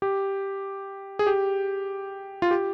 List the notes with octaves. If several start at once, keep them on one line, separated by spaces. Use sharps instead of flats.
G4
G#4
G4
F4
G4